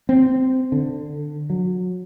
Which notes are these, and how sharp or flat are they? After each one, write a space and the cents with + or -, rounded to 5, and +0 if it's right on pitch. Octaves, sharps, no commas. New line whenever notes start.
C4 -10
D3 +15
F#3 -25